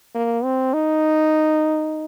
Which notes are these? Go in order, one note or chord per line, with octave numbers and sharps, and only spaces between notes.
A#3
C4
D#4